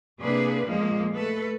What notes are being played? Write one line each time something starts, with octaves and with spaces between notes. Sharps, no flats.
C3 A#3 D4 G#4 B4
F2 A#2 F3 G#3 A#3
A3 A4 B4